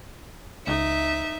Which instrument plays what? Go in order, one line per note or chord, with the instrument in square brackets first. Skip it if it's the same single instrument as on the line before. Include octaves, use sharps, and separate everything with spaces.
[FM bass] C#2 [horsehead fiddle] D#4 [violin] E5